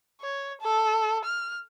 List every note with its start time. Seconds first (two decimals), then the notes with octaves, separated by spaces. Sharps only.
0.21 C#5
0.61 A4
1.24 F6